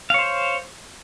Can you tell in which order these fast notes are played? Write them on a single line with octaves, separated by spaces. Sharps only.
F5 C#5 C5